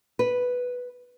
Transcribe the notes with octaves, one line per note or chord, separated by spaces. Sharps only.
B4